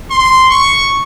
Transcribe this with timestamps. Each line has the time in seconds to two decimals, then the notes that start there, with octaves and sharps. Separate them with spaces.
0.11 C6
0.50 C#6